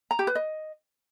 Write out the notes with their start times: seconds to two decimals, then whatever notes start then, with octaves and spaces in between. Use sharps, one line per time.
0.11 A#5
0.19 G4
0.27 B4
0.35 D#5